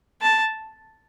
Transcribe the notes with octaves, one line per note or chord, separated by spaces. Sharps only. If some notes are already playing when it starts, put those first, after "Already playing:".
A5